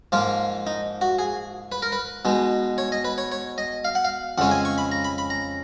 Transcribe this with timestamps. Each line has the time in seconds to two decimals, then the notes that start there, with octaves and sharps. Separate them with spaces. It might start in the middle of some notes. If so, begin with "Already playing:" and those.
0.12 G#2 F3 A#3 F4
0.67 D#4
1.01 F#4
1.19 G#4
1.72 B4
1.82 A#4
1.92 B4
2.25 B2 G#3 D#4
2.78 C#5
2.92 D#5
3.04 B4
3.18 C#5
3.32 C#5
3.58 D#5
3.85 F5
3.95 F#5
4.05 F5
4.38 F2 C#3 G#3 C#4 F#5
4.51 G#5
4.65 C#6
4.78 B5
4.92 A#5
5.04 B5
5.18 B5
5.30 A#5